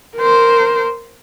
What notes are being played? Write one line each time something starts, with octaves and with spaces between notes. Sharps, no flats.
A#4 C5